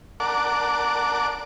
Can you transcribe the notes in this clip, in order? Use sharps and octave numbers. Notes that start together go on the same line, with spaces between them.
A#4 D5 F#5 A5 D6